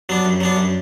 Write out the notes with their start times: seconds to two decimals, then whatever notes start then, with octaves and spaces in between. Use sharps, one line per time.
0.09 F#3 B3 D4
0.25 F#2
0.40 F#3 B3 D4
0.57 F#2